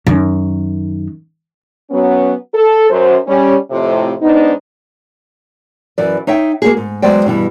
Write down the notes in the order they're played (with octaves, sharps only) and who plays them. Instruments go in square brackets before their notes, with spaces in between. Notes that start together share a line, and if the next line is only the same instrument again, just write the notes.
[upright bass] F#2 D#3
[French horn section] F#3 B3 C#4
A4
F#2 C5
G3 C#4
F2 A2 C3
G#2 B3 D4 D#4
[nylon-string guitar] F#2 E3 B4 D5
D#4 C#5 E5 G5
A#3 C#4 F#4 G#4
G#2
E2 F#3 G#3 C5 D5 G5
G2 B2 E3 G3